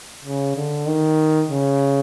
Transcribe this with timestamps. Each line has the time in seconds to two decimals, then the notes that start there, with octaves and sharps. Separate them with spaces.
0.24 C#3
0.56 D3
0.87 D#3
1.49 C#3